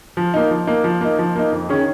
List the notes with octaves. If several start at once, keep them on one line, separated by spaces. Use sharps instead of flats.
F3
A#3 D#4
F3
A#3 D#4
F3
A#3 D#4
F3
A#3 D#4
F2
D#3 C#4 G#4